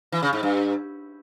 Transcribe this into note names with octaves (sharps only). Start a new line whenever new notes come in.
E3
C#3
G#2
G2